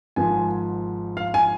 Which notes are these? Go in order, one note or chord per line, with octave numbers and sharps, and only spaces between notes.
G#1 G#2 F3 G#5
F5
G#5